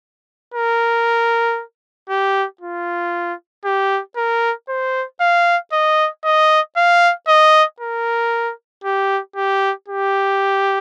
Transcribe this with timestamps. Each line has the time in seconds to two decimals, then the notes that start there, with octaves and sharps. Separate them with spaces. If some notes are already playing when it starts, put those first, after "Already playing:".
0.54 A#4
2.10 G4
2.61 F4
3.65 G4
4.17 A#4
4.69 C5
5.21 F5
5.73 D#5
6.24 D#5
6.77 F5
7.28 D#5
7.80 A#4
8.84 G4
9.36 G4
9.88 G4